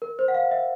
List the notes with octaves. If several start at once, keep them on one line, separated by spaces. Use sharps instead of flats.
A#4
C5
F#5
F5
E5